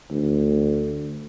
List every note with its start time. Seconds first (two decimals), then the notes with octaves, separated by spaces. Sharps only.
0.11 D2